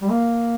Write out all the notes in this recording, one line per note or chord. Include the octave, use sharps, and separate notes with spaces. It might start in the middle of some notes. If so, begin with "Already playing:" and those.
G3
A#3